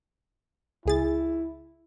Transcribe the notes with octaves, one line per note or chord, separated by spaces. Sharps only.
C#2 E4 G#4 A6